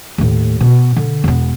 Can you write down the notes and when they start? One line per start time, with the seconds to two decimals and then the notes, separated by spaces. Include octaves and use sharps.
0.18 D#2 A2
0.61 B2
0.96 D3
1.24 E1 B3